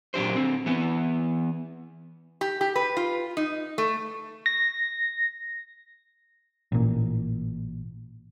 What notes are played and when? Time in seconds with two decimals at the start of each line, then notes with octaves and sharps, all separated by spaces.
0.14 A#2 F#3 D4 G4 C5
0.35 D3 C4
0.66 E3 B3
2.41 G4
2.61 G4
2.76 B4
2.97 F4
3.37 D#4
3.78 A3
4.46 A#6
6.72 A1 A#2